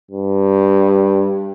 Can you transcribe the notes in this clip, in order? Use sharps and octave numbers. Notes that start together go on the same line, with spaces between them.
G2